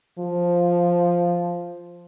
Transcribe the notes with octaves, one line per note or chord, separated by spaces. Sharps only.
F3